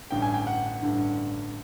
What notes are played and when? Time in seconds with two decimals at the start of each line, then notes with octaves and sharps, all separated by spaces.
0.11 A1 G2 D3 G5
0.22 G#5
0.34 G5
0.47 F#5
0.83 A1 G2 D3